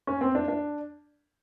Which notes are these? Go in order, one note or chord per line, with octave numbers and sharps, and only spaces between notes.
C#4
C4
D4
D4